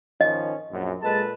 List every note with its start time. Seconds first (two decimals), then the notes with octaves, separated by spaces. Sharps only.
0.21 D#3 F3 C#4 D#5
0.71 A#1 F#2
1.02 A#2 G#3 A4 B4 A5